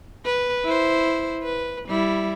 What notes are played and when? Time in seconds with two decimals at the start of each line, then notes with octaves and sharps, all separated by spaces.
0.25 B4
0.65 E4 C5
1.43 B4
1.89 G3 E4